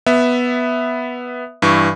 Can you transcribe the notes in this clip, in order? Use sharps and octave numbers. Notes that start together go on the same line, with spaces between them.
B3 E5
G2 E3 C#6